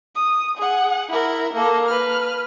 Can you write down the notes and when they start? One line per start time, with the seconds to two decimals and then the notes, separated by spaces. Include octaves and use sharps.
0.16 D#6
0.58 G#4 F#5
1.09 E4 A#4
1.54 A#3 A4
1.88 B4 F6